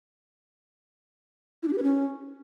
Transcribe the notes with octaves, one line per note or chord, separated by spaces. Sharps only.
E4
D4
G4
B4
C#4